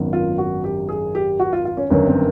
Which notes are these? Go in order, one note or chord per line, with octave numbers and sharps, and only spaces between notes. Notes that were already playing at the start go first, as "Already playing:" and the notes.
Already playing: G#1 F#2 D#3 F#3 B3
F4
F#4
G4
G#4
G4
F#4
F4
F4
C#4
G1 F#2 D#3 C#4
C4